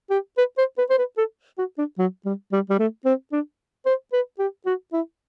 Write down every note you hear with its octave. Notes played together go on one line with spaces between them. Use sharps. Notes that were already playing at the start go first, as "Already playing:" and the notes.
G4
B4
C5
B4
C5
B4
A4
F#4
D4
F#3
G3
G3
G3
A3
C4
D4
C5
B4
G4
F#4
E4